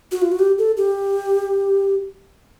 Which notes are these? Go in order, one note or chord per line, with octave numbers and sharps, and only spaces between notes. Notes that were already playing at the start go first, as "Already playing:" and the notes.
F#4
F4
F#4
G4
A4
G4